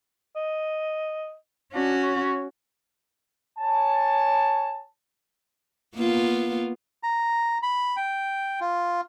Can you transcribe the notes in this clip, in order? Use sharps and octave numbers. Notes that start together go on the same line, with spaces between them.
D#5
C#4 D4 F#4
C#5
C#5 G#5 A5
A#3 B3 F4
A#5
B5
G5
F4